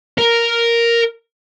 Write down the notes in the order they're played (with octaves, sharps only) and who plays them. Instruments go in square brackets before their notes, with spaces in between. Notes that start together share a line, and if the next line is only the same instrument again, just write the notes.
[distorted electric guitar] A#4